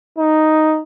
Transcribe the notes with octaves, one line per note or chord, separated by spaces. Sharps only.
D#4